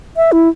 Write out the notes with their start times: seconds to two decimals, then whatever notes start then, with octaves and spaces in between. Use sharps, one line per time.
0.17 E5
0.32 E4